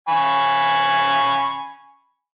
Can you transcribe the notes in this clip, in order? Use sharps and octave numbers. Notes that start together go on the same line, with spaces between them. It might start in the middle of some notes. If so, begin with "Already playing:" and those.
G#5 B5 C#6